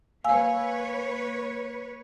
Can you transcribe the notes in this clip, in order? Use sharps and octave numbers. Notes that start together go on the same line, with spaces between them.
A#3 B4 C#5 F5 G#5 E6